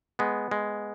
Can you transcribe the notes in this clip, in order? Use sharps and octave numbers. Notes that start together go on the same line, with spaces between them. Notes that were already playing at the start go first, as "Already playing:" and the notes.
G#3 B3
G#3